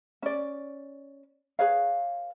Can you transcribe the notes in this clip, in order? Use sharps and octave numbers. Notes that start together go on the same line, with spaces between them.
C#4 D5
G#4 B4 C#5 F5